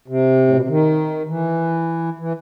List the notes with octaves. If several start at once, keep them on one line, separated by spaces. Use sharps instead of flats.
C3
A2
B2
C3
D#3
E3
E3